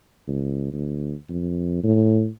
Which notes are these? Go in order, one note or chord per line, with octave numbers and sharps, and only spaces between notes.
C#2
D2
F2
A2